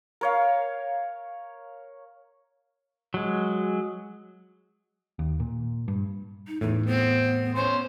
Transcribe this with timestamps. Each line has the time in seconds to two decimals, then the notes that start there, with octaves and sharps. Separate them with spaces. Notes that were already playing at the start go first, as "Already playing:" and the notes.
0.21 A#4 C#5 F5
3.14 F#3 G#3
5.19 D#2
5.40 A#2
5.88 G2
6.47 D#4
6.61 E2 A2 D#4
6.86 B3 C4
7.55 B3 C#4 C5